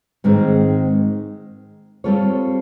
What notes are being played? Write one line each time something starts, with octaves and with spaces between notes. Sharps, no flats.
G#2 D#3 G#3 C4
G3 C4 F4 A4 C#5